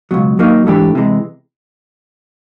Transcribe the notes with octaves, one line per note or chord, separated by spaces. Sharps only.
C#2 B2 F#3
F#3 A#3 D#4
G#2 E3 A3 D4 G4
C3 E3 G#3